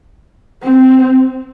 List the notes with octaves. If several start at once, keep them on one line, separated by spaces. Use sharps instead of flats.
C4